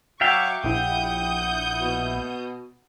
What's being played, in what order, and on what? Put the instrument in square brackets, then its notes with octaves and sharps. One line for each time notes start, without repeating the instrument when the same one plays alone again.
[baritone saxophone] F#3 [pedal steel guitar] E5 F5 G5 [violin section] C#6 D6
[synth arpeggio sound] A#1 E4 [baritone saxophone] G4 [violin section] F#5 D#6 G6
[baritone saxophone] B2